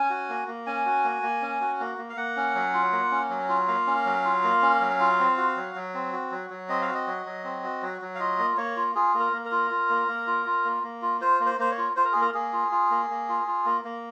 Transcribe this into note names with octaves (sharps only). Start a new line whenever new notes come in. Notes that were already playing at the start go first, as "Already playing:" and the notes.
Already playing: C#4 G#5
F#4
A#3
A#3
C#4 G#5
F#4
A#3
A#3
C#4
F#4
A#3
A#3
F5
A#3 F#5
C#4
F#3
F4
A#3
C#4
F#3
F4
A#3 F5
C#4
F#3
F4
A#3
C#4
F#3
F4
C4
F#4
F#3
F#3
C4
F#4
F#3
F#3
C4 D#5
F5
F#4
D#5
F#3
F#3
C4
F#4
F#3
F#3
F5
F4 D#5
A#3
A#3 C#5
F4
F4 G#4
A#3
A#4
A#3
A#4
F4
F4
A#3
A#3
F4
F4
A#3
A#3
F4
F4 C5
A#3
C5
A#3 C5
C#5
F4
F4 C5
A#4
A#3 G#4
A#4
A#3 G#4
F4
F4
A#3
A#3
F4
F4
A#3
A#3